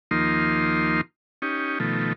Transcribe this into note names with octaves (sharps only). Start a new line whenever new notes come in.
D#2 F3 A#3 D#4 C6
C#4 D#4 G4
B2 D#3 F3 A3